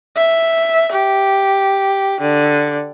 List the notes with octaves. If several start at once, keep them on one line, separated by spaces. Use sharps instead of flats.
E5
G4
D3